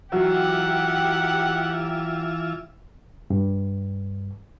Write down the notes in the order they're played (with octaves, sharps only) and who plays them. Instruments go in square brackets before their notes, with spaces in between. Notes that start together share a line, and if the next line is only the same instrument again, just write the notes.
[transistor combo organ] E3 F4 E5 [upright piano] F#3 [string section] G4 [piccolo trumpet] F#5
[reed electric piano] G2